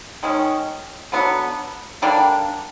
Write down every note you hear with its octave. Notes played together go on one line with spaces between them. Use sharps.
D#3 G#3 C#4
D3 F#3 B3
D3 G3 A#3 D4